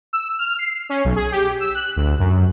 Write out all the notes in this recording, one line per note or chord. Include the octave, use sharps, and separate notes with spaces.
E6
F6
C7
C#4
B1
G#4
G4
E6
F#6
D2
F#2